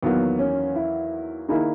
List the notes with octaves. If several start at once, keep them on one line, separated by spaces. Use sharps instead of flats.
E2 D#3 F#3 A#3 B3
C#4
E4
D#3 A#3 D#4 E4 G#4